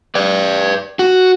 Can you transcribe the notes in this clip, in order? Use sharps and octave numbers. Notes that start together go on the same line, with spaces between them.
B4 D5
F#4